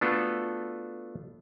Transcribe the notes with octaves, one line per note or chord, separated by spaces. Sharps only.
A3 B3 D4 F4 F#4 A4